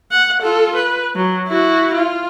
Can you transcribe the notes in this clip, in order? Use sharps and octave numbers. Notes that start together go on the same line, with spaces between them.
F#5
F4 A4
B4
F#3
E4 F#4
F4